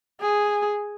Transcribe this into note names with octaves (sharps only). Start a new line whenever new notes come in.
G#4